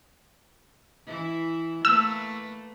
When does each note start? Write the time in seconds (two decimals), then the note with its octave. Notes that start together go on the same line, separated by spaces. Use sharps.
1.06 E3 E4
1.85 A3 A#3 B4 E6